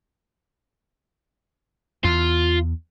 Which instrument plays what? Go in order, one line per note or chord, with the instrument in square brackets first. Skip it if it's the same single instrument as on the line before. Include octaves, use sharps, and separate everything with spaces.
[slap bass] E2 [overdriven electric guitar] F4